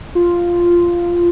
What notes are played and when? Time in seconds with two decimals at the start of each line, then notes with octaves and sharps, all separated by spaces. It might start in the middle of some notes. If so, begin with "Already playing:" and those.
0.15 F4